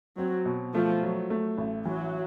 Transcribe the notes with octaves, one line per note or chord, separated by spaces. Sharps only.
F#3 C4
B2
F3 A3
F#3
A3
A1
E3 F#3